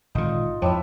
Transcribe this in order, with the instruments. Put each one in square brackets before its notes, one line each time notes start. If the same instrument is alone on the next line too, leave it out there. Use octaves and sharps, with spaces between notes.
[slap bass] G#1 D3 [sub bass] A#2 [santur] D#4 F4
[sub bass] F2 [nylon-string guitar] G#2 C#5 G5 [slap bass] F3 [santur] D4 E4 E5